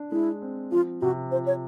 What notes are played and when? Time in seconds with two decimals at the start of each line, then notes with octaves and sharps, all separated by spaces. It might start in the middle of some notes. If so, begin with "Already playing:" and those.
Already playing: D4
0.11 G#3 E4
0.42 C4
0.71 F3 F4
1.01 C3 F#4
1.31 F3 C5
1.47 C#5